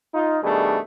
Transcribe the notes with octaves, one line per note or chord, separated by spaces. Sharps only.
D#4 F4
B2 D#3 G3 A3 D4 G#4